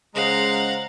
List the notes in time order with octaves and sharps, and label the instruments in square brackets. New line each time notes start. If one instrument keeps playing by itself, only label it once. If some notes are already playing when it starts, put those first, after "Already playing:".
[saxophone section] C#3 G#3 [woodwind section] C5 A#5 [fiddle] F5 F#5